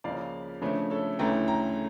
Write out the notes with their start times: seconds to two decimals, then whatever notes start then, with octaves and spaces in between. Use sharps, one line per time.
0.04 C#2 C#3 F3 A#3 C#4 D5 F5
0.62 C#3 F3 A3 D4 C#5 E5
0.90 A4 C#5
1.19 D2 C#3 E3 A3 C#4 G5 A#5
1.48 G5 A#5